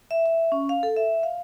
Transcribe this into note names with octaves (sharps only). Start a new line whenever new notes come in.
E5
E5
C#4
F5
A4
E5
F5